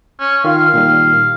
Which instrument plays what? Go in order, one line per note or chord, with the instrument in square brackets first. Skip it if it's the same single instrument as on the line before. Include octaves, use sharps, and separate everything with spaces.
[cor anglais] C#4
[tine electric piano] D#3 F4 [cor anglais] F5
[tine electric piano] A#2 D#3 G3